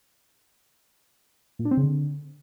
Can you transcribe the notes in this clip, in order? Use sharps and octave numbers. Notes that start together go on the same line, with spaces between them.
A#2
D4
C4
C#3
D3